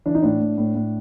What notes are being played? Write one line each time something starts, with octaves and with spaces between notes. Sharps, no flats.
E3 D4
D#4
A2 D4
A2
A2
A2